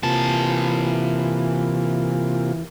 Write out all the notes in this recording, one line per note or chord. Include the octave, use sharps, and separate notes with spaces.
C3 E3 A#3 F4 A5